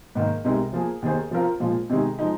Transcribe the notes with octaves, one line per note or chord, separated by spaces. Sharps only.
G#2 D#3 A#3
C2 C3 G#3 D#4 A#4
F3 A#3 G#4
D#2 D#3 A#3 G#4 C5
F3 C4 F4 A#4
A#2 F3 G#3 F4
C3 D#3 G#3 D#4 G#4
F3 G#3 D#4